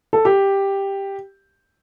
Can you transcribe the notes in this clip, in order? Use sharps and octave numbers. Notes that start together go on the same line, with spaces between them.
A4
G4